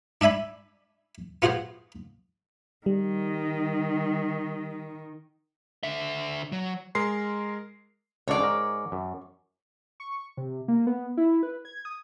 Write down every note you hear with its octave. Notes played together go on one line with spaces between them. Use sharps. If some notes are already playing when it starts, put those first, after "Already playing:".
D4 D5 E5 G#5 B5
B3 F4 F#4 G#4 C5
D#3 G3
D3 E5
F#3
G#3 A#4 C6 C7
C#2 D3 C#5 D5
G#2 A#4
F#2
C#6
C3
A#3
B3
E4
B4
G#6
D#6